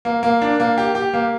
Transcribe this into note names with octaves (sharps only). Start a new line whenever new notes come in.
A#3
A#3
D4
A#3
G4
G4
A#3